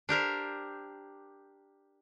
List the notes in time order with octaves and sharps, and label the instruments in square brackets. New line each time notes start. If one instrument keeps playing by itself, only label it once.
[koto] D4 G4 A#4 C5